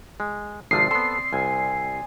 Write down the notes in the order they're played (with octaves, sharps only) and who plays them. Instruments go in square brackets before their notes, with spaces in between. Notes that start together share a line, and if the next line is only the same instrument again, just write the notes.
[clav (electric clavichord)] G#3
[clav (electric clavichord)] G#1 C3 F3 [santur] C4 D5 D#6 [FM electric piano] C7
[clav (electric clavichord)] B3 A4 [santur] C6 E6
[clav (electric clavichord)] C2 [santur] G#5